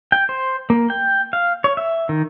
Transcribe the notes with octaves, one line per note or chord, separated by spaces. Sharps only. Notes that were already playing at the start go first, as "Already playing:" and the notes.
G5
C5
A#3
G5
F5
C#5
E5
D#3